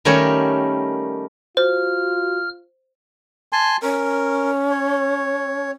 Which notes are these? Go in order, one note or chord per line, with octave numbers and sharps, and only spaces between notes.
D#3 G3 A3 C#4 A#4 C#5
F4 F#4 C5 F6
G#5 A5 C6
C#4 A#4
C#5